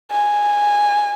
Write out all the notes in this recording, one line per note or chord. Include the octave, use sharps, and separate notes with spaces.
G#5